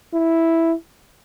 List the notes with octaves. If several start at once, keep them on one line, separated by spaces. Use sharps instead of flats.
E4